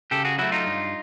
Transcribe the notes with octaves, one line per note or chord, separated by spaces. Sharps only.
C#3 G4 A4
F#4 G#4
F#3 A3 E4 F#4
D#4 F4
G2